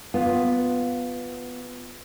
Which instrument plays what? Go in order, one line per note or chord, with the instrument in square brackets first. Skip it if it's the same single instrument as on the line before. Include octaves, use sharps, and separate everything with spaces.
[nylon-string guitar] B3 F4